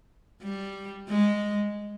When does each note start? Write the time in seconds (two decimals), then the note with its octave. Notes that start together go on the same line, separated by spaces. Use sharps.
0.43 G3
1.08 G#3